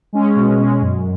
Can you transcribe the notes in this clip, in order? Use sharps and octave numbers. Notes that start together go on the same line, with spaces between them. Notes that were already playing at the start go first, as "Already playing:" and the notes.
G#3 C#4
B2
G#3 C#4
F#2